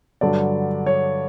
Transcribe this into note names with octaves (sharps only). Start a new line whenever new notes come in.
G2 D3 F#3 D5
C#5